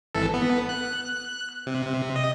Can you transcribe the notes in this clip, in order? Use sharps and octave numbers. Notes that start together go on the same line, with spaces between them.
G#1 E3 A4
B3
F#6
C3
C3
D#5